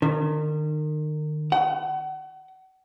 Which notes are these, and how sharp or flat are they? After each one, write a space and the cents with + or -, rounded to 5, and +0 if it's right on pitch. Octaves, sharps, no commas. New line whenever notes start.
D#3 -35
F#5 +35